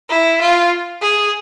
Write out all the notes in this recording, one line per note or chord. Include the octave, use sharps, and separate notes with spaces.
E4
F4
G#4